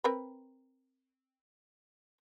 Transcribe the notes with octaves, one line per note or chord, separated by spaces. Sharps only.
C4 A#4 B4